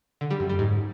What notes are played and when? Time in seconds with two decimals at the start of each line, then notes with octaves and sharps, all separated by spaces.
0.21 D3
0.30 G3
0.40 F#2
0.49 G3
0.59 G#2